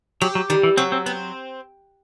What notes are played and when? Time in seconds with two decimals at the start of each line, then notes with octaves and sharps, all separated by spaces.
0.21 F#3 G4
0.35 F#3
0.50 D#3 G3
0.63 E3
0.77 F#3 C4
0.92 C4
1.06 B3 C4